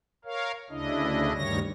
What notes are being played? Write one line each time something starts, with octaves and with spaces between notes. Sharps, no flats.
A#4 C#5 F5
D2 C#3 D4 E4 D#5
D2 G2 D#3 G3 C#5 A#6